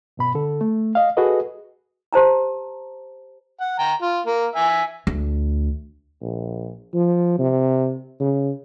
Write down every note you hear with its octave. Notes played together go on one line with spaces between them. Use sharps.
G2 B2 B5
D3 A4
A3
D#5 F5
F#4 G#4 A4 B4 D#5
G4 C5 A5 A#5
F#5
G5 A#5
F4
A#3
E5 G#5
D2
A#1
F3
C3
C#3